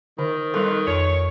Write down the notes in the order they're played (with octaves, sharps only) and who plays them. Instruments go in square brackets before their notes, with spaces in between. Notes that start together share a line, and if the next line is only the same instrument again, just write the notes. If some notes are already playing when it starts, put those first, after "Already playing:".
[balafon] D3 [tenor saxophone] D#3
[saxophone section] F2 F4 B4 [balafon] G3 D#4 A4
[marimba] F2 [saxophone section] C#5